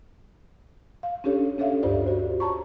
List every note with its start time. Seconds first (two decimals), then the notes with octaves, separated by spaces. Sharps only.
1.03 F5
1.24 C#4 D4 G4 A4 C#5
1.58 C#4 D4 A4 C#5 E5 F5
1.83 D2 G2 F4 G4 C5 D5
2.06 F#4 C5
2.40 C#5 A5 A#5 C#6